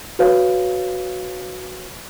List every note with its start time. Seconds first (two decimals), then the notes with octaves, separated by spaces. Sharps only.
0.19 F#4 B4 C#5 F5